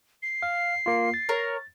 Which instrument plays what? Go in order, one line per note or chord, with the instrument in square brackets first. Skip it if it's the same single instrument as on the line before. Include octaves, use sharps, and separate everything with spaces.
[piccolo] C7
[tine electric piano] F5
A#3 F4
A6
[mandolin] A#4 C#5